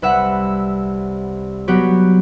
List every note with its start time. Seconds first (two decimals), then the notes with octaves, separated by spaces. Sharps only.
0.02 C2 B4 E5 F#5
1.68 F#3 B3 F#4 G4